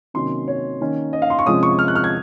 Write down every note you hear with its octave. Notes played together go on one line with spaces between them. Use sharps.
C3 D#3 F#3 A#3 C#4 C6
C#5
D#3 A#3 C#4
D#5
F5
C6
C#6
C3 F3 G#3 C#4 D#6
C#6
F6
F#6
F6
G#6